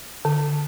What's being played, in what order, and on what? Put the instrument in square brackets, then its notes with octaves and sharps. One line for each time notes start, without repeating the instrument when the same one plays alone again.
[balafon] D3